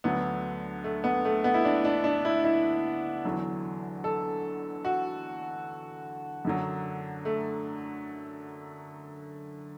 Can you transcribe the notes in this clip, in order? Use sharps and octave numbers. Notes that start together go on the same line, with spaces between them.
D2 D3 F#3 B3
A3
B3
A3
B3
E4
D4
D4
D4
E4
E4
E2 D3 F#3
A4
F#4
F#2 D3 F#3
A3